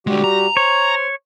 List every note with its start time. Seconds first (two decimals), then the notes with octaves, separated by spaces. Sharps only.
0.07 D3 G3 G#3 F#4 G4
0.24 A#5
0.57 C5 C#5